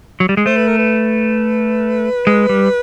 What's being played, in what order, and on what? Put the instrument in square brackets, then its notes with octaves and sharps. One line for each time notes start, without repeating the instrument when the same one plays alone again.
[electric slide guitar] F#3
G3
G#3
[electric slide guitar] A3 [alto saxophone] C5
[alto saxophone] B4
A#4
B4
[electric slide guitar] G#3
G3